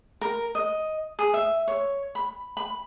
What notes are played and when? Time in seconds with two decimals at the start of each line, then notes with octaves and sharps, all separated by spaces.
0.21 A#4
0.55 D#5
1.19 G#4
1.34 E5
1.68 C#5
2.15 B5
2.57 B5